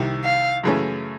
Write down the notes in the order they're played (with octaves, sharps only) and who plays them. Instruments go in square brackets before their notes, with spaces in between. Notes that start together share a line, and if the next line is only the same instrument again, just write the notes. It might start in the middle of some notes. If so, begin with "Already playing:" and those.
Already playing: [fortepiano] C2 C3 D#3
[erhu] F5
[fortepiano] F#2 C#3 E3 A3 C#4